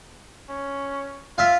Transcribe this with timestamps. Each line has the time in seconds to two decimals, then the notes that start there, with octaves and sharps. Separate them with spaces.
0.49 C#4
1.38 F4 E5 F5